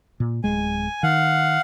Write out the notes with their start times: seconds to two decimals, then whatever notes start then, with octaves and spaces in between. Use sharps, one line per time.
0.20 A#2
0.44 D1 G#3 G#5
1.03 D#3 F5 F#5